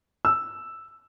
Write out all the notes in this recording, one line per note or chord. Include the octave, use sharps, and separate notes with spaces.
E6